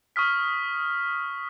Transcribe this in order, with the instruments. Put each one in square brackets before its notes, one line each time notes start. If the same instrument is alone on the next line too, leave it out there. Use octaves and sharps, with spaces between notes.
[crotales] C#6 D#6 F6 B6